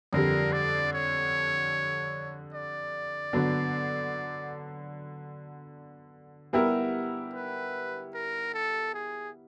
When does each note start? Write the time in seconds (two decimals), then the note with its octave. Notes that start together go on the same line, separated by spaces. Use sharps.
0.13 F2 D3 G3 A#4
0.53 D5
0.93 C#5
2.54 D5
3.33 D3 F#3 B3 D4
6.53 G3 B3 E4 G4 A#4
7.33 B4
8.14 A#4
8.54 A4
8.94 G#4